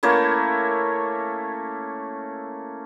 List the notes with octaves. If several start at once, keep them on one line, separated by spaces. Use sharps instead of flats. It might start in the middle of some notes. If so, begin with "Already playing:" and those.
A3 A#3 C#4 E4